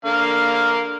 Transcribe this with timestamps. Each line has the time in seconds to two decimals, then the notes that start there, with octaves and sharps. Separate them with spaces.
0.05 D3 A#3 F5